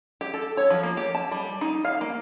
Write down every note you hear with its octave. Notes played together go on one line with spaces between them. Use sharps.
G4
A4
C#5
F3
A#3
G4
A5
G3
D#4
F5
A#3